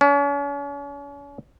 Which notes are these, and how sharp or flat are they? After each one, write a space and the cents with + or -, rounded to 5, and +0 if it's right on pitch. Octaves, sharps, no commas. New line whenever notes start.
C#4 +40